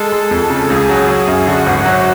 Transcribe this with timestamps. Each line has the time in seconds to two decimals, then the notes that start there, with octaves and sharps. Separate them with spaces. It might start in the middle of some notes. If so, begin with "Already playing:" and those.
Already playing: G#3 A4
0.12 G#3
0.31 F2
0.50 C#3
0.70 C#2 G#4
0.89 F#3
1.08 F#3
1.27 F#2
1.47 D3 F#4
1.66 G#1
1.85 F#3